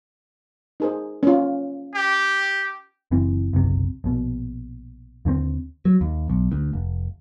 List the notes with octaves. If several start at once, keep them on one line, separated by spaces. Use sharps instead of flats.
D#4 G#4 C5
C#4 F4
G4
F#1 E3 C4
F#1 B1 C3
A#1 B2
D#2 D3 F3 C4
F#3
D#2
B1
D2
F1